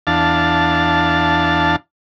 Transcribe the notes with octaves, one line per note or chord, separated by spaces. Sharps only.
E2 D4 F5 A5